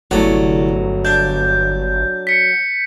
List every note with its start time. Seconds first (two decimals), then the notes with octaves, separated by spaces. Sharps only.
0.11 G1 C2 F#3 A3 D5
1.05 D4 G6
2.27 B6 C#7